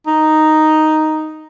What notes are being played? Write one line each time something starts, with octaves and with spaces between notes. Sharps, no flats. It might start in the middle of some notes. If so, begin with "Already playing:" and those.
D#4